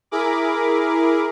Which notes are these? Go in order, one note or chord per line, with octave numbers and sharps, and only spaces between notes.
E4 G#4 A#4 B5 D6